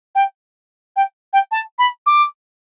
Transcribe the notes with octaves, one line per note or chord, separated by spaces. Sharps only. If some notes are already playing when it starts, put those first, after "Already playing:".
G5
G5
G5
A5
B5
D6